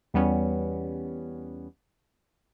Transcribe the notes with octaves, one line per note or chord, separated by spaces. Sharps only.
E2 G3 B3 C#4